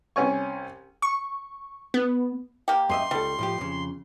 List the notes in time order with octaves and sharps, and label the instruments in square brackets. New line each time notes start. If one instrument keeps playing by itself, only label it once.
[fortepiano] C2 C#4 G#5 C#6
[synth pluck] C#6
B3
[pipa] A#3 G4
[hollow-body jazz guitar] F#2 D#5 E5 [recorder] C6
[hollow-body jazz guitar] C#2 A4 [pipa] G3
[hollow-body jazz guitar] A2 F3 G4
F2 C#3